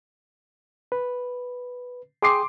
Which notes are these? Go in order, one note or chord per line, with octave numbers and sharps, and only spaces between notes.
B4
G#4 G5 C6 D6 D#6 C7